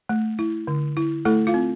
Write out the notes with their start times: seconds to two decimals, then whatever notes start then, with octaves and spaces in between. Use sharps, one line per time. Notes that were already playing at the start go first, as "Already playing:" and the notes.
0.09 A3
0.39 E4
0.67 D3
0.97 E4
1.25 A3 E4 A4
1.47 F4 F5
1.54 C4